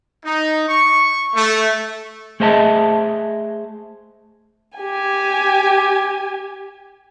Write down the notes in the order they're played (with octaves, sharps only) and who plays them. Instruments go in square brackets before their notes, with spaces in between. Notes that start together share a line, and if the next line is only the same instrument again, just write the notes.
[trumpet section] D#4
C#6
A3
[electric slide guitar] A3 G#4 C5 D#5 E5 A5
[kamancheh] G4 G#5